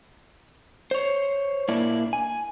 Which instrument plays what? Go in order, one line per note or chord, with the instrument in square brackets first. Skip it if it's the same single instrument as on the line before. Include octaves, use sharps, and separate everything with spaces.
[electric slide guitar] C5 C#5
A#2 A#3 D4 E4
G#5